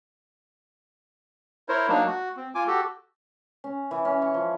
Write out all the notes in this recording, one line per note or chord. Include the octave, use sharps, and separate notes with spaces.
E4 A#4 C5 C#5
F#3 A#3 D4 D#4
F#4
C4
F4 G#5 D6
F#4 G4 A4
C#4
E3
C#4
C#6
F3